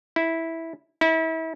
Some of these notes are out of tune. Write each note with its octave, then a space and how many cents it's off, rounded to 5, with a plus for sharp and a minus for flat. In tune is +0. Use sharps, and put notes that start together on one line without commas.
E4 -10
E4 -35